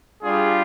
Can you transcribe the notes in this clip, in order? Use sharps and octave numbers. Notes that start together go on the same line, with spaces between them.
G3 D4 F4 G#4